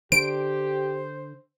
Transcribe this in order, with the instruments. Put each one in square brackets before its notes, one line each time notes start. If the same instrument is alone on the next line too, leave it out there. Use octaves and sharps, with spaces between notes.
[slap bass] D3 [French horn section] G4 [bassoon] C5 [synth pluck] D7